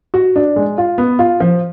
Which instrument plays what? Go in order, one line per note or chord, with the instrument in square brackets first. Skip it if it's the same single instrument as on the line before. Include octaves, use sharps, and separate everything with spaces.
[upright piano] F#4
D4
G#3
F4
B3
F4
F3